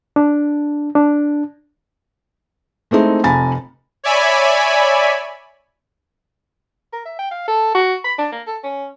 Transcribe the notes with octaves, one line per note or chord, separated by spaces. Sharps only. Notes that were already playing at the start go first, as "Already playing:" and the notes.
D4
D4
G#3 A3 C4 D#4 E4
F1 F2 G#5 A#5 B5 A6
C#5 D5 E5 G#5 B5
A#4
E5
G5
F5
A4
F#4
B5
D4
A#3
A4
C#4